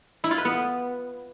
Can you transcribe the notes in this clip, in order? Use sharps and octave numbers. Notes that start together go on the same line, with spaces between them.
E4
F4
B4
B3